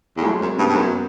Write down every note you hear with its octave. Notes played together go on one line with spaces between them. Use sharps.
E2 A3
F2 F#3 G#3
F#2 A#3 C4
G2 B3 C#4
G2
F#2